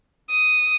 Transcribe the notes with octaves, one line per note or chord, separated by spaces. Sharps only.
D#6